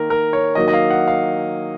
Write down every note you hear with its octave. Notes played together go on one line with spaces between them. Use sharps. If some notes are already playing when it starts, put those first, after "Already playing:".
Already playing: D#3 A#3 A#4
A#4
C#5
D#3 F#3 A#3 D#5
D#5
F5
F#5
F5